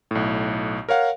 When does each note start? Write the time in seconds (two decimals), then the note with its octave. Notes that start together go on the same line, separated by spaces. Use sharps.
0.11 B1 A2
0.89 A#4 C#5 F5 F#5